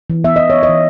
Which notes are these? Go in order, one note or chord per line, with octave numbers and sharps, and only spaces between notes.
E3
B3 E5
E3 D#5
B3 C#5
D#5
E3